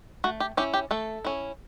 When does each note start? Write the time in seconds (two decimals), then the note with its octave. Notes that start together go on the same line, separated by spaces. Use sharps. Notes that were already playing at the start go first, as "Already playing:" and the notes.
0.24 A3 F#4
0.40 G4
0.57 C#4 E4 G4
0.74 G4
0.91 A3 A4
1.25 C#4 E4